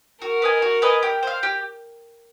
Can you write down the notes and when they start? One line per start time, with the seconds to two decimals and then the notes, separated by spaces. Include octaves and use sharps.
0.21 F#4 A#4
0.42 B4 D#5 G#5
0.62 F#4
0.82 B4 D#5 G#5
1.03 G4
1.23 C5 F5
1.43 G4